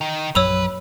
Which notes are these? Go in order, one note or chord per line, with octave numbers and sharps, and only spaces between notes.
D#3
A#1 F#2 F#3 B4 C#5 E6 F7